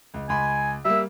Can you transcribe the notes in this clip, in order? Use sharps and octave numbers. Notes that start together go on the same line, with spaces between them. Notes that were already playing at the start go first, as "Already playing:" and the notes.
C#2
C#2 G#5 B5 C6
G3 A#3 E5